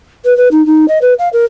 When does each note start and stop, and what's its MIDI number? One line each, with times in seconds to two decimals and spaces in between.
0.24 0.35 71
0.37 0.48 71
0.51 0.64 63
0.66 0.85 63
0.88 0.98 75
1.01 1.13 71
1.18 1.28 77
1.33 1.44 70